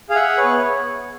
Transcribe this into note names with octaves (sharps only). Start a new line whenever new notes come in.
G#4 F5
E5 F#5
G#4
B4 C#5
B3